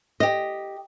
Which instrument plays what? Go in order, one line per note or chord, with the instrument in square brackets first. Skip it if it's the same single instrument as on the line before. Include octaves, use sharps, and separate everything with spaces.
[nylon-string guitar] G4 D#5